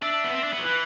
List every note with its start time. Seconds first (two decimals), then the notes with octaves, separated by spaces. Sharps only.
0.02 D4 E5
0.24 B3
0.32 C4
0.43 D4
0.53 B3
0.59 F#3
0.64 E3 B4